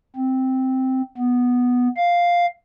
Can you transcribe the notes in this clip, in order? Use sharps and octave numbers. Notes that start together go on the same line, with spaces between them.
C4
B3
F5